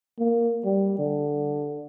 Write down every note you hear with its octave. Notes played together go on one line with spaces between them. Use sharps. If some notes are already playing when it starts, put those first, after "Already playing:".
A#3
G3
D3